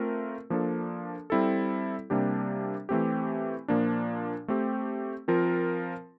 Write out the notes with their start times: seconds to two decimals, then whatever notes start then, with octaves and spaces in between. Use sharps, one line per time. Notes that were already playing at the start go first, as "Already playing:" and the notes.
Already playing: A3 C4 F4 A#4
0.50 F3 A#3 D4 A4
1.30 G3 C4 E4 A4
2.10 C3 G3 A#3 D4 G4
2.89 E3 A3 C4 G4
3.68 A#2 F3 A#3 D4
4.48 A3 C4 G4
5.28 F3 C4 F4 A#4